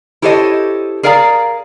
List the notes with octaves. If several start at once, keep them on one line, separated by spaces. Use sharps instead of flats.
E4 G4 A4 C5 C#5 D#5
G#4 A#4 D5 F5 G#5 A#5